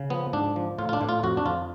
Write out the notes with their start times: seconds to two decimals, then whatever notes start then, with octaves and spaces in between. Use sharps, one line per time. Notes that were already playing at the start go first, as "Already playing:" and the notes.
Already playing: C#3
0.10 F3 B3
0.33 G#2 D4
0.56 F3
0.78 A2 F4
0.89 F4
0.93 D4
1.01 A2
1.09 F4
1.23 F2 F#4
1.37 D4
1.46 F2 F4